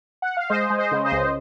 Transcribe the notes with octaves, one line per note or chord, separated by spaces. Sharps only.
F#5
F5
G#3 C5 D#5
G#3
C5 D#5
C#3
C5 D#5
C#2